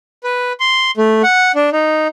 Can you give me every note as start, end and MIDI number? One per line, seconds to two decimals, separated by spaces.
0.24 0.53 71
0.60 0.91 84
0.97 1.22 57
1.23 1.52 78
1.55 1.70 62
1.73 2.08 63